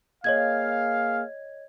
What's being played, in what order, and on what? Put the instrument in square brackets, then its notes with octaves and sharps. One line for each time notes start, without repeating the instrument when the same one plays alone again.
[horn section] A#3 G#4 F5 [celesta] C#5 D#5 G#6